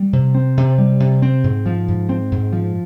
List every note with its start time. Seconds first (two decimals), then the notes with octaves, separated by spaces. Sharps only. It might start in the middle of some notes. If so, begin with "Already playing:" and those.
Already playing: G3
0.13 C3
0.35 C4
0.57 C3
0.78 G3
1.00 C3
1.22 C4
1.44 G#2
1.66 F3
1.88 G#2
2.09 C4
2.32 G#2
2.53 F3